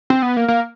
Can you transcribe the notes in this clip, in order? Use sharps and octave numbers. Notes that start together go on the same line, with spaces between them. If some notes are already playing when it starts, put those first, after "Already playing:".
C4
B3
A#3
A#3